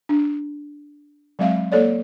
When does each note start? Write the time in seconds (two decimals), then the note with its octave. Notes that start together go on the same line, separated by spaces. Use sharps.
0.09 D4
1.39 F#3 G#3 C4 E5 F5
1.72 A#3 A4 C#5 D5